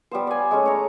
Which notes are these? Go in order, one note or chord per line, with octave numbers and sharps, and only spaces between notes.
G3 B3 C5
D5 G#5
G#3 A3 C#4
C#5 A#5